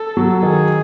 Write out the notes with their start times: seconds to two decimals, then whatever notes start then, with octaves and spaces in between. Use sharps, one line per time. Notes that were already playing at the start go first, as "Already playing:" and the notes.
Already playing: A4
0.17 F#3
0.42 D#3 G#4